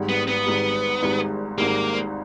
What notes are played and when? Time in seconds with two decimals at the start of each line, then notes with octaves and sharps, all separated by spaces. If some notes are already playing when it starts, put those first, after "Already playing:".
Already playing: G#1 G#2 G3
0.09 B3
0.28 B3
0.46 G#1 G#2 G3
1.03 G#1 G#2 G3
1.58 G#1 G#2 G3 A#3